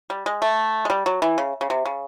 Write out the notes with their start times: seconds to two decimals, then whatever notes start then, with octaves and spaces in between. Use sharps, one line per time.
0.10 G3
0.26 G#3
0.42 A3
0.85 G#3
0.90 G3
1.06 F#3
1.22 E3
1.38 C#3
1.61 C#3
1.70 C3
1.86 C#3